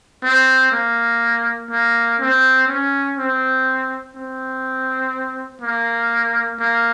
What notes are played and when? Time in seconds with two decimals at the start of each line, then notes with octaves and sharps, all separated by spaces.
0.24 C4
0.72 A#3
1.71 A#3
2.20 C4
2.68 C#4
3.17 C4
4.15 C4
5.62 A#3
6.60 A#3